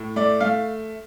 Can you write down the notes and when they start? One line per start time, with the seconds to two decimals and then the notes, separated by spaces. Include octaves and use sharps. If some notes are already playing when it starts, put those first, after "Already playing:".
Already playing: A2
0.16 A3 D5
0.40 A3 F5